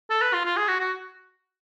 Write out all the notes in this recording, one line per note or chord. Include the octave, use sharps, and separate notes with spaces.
A4
B4
F4
F4
G#4
F#4
F#4